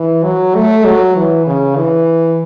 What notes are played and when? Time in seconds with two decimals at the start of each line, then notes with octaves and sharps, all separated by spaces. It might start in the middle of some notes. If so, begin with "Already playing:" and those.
Already playing: E3
0.24 F#3
0.55 A3
0.85 F#3
1.16 E3
1.47 C#3
1.77 E3